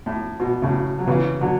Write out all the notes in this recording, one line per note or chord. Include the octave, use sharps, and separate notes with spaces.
A2
B2
A2 C#3
F#3
C#3 E3
D3 F#3